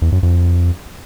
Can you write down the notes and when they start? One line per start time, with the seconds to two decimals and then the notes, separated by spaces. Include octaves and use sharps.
0.02 E2
0.12 F#2
0.23 F2